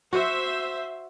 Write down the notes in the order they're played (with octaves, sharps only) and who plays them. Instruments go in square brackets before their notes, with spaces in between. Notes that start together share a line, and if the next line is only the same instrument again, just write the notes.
[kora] F#4 [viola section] C5 E5